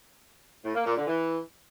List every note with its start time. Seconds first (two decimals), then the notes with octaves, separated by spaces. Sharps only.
0.64 A2
0.75 A#3
0.86 A#2
0.97 D3
1.07 E3